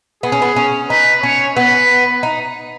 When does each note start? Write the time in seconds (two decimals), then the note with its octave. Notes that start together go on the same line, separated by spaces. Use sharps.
0.23 B3 G#4
0.32 C#4
0.42 B3
0.56 C#4
0.90 D#4 B4
1.23 C#4 C#5
1.56 B3 B4
2.23 D#4